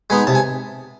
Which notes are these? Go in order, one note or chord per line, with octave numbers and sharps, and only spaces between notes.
G#3 B3 D#4 G#5
C3 A5
G#5